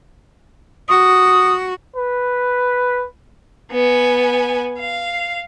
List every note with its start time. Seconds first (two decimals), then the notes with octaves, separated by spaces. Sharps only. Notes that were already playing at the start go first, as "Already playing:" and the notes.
0.89 F#4 D#6
1.96 B4
3.71 B3 G#5
4.80 F5